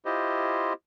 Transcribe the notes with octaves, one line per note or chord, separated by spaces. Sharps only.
E4 F4 G4 C5 D#5